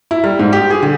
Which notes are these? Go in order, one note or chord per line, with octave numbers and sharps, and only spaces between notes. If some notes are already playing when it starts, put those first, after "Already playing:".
E4
G3
G#2
G4
G#4
D3